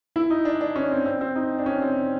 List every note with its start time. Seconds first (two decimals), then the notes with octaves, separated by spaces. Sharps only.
0.16 E4
0.30 D#4
0.45 D4
0.61 D4
0.76 C#4
0.91 C4
1.06 C4
1.21 C4
1.36 D#4
1.58 D4
1.66 C#4
1.82 C4